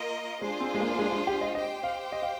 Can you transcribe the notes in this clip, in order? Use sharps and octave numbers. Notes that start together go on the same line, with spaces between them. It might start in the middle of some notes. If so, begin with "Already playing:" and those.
Already playing: A#3 F4 A#4 D#5
G#3 D4 F4 G#4 C5
C4
G#3
A#3
A#3
G#3
G#3
G4
D#5
G4 C5 D#5 G5
F5
D#5
F5